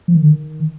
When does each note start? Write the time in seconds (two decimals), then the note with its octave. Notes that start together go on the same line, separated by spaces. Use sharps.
0.08 F3
0.15 D#3
0.22 D3
0.29 D#3